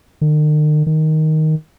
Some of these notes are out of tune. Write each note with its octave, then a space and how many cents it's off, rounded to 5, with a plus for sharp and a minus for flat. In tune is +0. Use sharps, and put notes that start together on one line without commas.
D#3 -45
D#3 +5